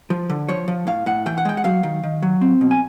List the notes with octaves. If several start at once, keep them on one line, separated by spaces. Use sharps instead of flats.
F3
D3
F3 C#5
F3
A2 F5
A2 F#5
E3 G5
F#5
G#3 G5
F#5
F#3 F5
D#3
D#3
F#3
C4
B2
G#5